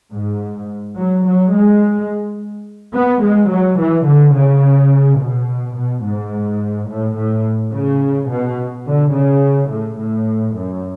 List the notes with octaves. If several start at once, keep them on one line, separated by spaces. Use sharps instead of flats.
G#2
F#3
F#3
G#3
B3
G#3
F#3
E3
D3
C#3
B2
B2
G#2
A2
A2
C#3
B2
D3
C#3
A2
A2
F#2